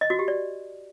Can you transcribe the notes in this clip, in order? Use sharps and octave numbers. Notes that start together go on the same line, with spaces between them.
D#5
F#4
G4
D5